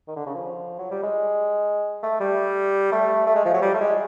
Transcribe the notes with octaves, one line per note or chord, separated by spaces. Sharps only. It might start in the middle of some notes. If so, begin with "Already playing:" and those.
D#3
D3
C#3
F3
F#3
G3
G#3
A3
G3
A3
A3
G#3
F3
F#3
G3
A3
G#3